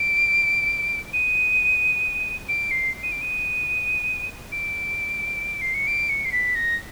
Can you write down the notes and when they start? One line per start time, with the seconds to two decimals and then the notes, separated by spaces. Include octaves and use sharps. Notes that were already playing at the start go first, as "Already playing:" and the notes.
Already playing: D7
1.13 D#7
2.49 D7
2.71 C7
3.03 D#7
3.12 D7
3.21 D#7
4.52 D7
5.61 C7
5.74 C#7
5.87 D7
6.09 C#7
6.25 C7
6.32 B6
6.55 A#6